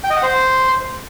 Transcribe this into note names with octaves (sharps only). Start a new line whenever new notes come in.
G5
D#5
F#5
C5